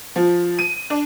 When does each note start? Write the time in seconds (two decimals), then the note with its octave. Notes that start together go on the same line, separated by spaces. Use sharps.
0.16 F3
0.59 D#7
0.90 D4